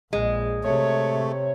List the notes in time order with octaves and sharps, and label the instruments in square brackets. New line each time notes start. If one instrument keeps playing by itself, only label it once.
[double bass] A#1 [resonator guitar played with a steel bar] G#3
[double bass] C3 [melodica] A3 [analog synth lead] C#5